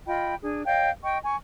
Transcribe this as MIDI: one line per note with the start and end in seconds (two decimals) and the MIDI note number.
0.06 0.34 65
0.06 0.34 75
0.06 0.34 79
0.06 0.34 83
0.42 0.63 62
0.42 0.63 68
0.66 0.89 73
0.66 0.89 75
0.66 0.89 77
0.66 0.89 79
1.03 1.19 75
1.03 1.19 79
1.03 1.19 85
1.24 1.37 80
1.24 1.37 85